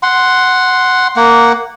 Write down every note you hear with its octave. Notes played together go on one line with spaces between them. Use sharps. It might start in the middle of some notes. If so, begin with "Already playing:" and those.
F#5 C6
A#3 F#5